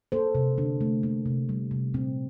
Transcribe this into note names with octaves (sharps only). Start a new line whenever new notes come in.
A#3 A4 C5
C3
D3 A#3 D4
A3
A3 A#3
C3
G3
C3
A#2 C4